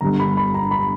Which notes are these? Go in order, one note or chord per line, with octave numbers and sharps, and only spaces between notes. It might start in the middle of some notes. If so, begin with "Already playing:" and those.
G1 G2 D3 A#5
B5
B5
A#5
B5